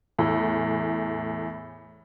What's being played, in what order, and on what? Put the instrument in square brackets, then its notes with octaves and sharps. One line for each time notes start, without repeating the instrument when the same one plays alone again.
[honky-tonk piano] E2 A2